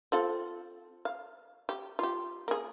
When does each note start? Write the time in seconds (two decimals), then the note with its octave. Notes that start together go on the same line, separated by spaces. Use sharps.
0.12 C4 F4 A4
1.05 F5
1.69 G4
1.99 F4 G4
2.48 A#3 G#4